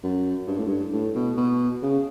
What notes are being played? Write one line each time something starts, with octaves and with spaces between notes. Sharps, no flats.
F#2
G2
A2
G2
A2
B2
B2
C#3